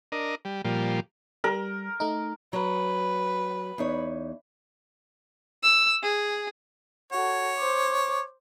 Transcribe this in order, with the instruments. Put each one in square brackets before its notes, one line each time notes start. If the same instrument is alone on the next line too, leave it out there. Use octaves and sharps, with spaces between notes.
[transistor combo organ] D4 A#4 D#5
G3
A#2 F3 G3
[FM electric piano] G3 [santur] A#4
[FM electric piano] A3 D#4
[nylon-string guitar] F#3 [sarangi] B4
[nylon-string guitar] E2 D#4 C#5
[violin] E6
G#4
[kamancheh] F#4 A4 [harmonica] C#5
[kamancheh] C5 D6